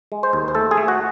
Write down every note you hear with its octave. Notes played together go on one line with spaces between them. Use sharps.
G#3
C5
D#2
C5
A3 A4
G#4
A3
F#4